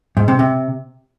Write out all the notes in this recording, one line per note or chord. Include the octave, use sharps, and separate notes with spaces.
G#2
C3
C3